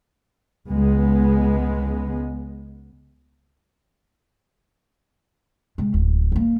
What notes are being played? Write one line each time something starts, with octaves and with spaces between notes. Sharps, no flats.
C#2 G#3 B3
C3 G#3
D1
G3 A#3